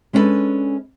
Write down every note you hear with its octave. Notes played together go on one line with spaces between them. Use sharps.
G#3 C#4 D4 F#4 A4 B4